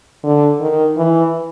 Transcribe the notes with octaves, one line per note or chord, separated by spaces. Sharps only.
D3
D#3
E3